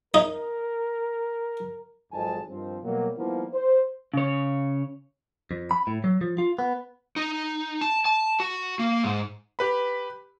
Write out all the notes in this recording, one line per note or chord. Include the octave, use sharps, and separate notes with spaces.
D#4 A#4
G#1 F2 F#3 G#3 G#5 A5
G2 D#3 F3 C4
B2 F#3 G3 A#3
D#3 F3 G3 A#3 B3 E4
C5
C#3 C#5
F2
B5
A2
F#3
F3
F4
B3
D#4
A5
A5
F#4
A#3
G#2
G4 B4 B5